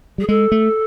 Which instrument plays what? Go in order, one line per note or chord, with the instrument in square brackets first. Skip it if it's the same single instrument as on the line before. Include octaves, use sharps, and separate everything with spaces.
[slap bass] G3 [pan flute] G#4
[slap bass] G#3 [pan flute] A4
[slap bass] A3